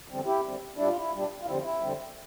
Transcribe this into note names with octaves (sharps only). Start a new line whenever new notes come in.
E2 D3 G3 C4
E4 G4
E2 D3 G3 C4
A#2 G3 D4 E4
F4
E4
A#2 G3 D4
F4
F2 D3 G3 C4 E4
E4
F2 D3 G3 C4